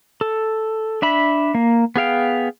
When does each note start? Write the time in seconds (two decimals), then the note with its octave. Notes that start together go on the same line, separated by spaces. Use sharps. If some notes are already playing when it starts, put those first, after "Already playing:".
0.21 A4
1.02 D4 E5 B5
1.55 A#3
1.96 B3 G#4 F5 G5